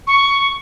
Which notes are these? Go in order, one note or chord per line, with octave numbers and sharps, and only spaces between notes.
C#6